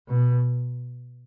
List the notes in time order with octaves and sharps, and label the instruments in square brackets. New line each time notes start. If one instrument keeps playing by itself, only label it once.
[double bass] B2